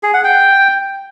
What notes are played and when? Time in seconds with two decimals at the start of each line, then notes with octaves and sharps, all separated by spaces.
0.03 G#4
0.14 F#5
0.24 G5